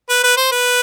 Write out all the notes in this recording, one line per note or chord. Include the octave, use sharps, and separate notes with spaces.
B4
B4
C5
B4